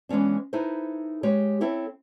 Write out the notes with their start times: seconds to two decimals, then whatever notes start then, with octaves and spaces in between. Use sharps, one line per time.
0.09 E3 G#3 B3 C#4 D4
0.53 D#4 E4 A4 B4 C5
1.23 G#3 G4 C#5
1.61 C4 E4 A4 C#5 E5